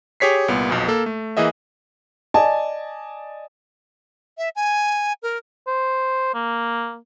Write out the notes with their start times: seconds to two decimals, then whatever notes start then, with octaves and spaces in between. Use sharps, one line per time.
0.20 G4 G#4 C#5 B6 C7
0.48 C2 A#2 B3
0.70 B1 F2 B2
0.88 A#3 A4
1.06 A3
1.37 E3 A#3 G#4 D#5 E5
2.34 D5 D#5 G#5 A5
4.38 E5
4.56 G#5
5.23 A#4
5.67 C5
6.34 A#3